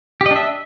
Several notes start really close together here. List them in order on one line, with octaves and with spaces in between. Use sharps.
G4 D#5 D4 E5